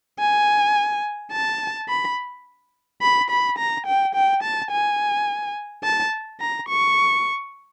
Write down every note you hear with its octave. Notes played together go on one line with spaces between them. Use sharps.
G#5
A5
B5
B5
B5
A#5
G5
G5
A5
G#5
A5
A#5
C#6